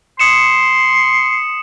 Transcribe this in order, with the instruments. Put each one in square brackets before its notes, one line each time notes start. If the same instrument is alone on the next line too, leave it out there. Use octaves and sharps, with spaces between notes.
[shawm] C6 [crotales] D#6 C#7 E7